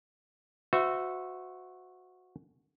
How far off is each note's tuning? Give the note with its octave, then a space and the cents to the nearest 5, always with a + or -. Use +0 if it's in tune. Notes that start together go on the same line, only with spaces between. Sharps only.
F#4 -15 C5 -35 E5 +0